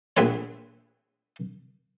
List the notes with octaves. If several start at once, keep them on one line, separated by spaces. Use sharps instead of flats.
A#1 B3 C4 B4 C#5